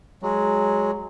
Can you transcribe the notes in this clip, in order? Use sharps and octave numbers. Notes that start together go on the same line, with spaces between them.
F#3 G#3